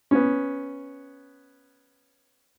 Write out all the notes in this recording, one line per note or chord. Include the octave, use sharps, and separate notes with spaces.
B3 C#4